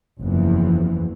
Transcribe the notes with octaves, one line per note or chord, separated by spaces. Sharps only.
F#1 E2 E3 F3